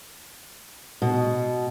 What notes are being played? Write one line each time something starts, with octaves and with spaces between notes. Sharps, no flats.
B2